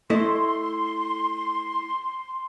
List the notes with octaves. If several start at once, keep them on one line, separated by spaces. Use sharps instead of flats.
A3 E4 D#5 C6